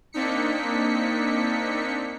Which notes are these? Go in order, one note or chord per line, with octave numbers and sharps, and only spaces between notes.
A#3 C4 D4 D#4 B6 C#7